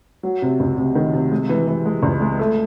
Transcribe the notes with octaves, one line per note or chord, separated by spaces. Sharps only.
F#3
C3
C#2
C3
D#3
C3
G#3
E3
E3
G#3
C#2
G#3
A3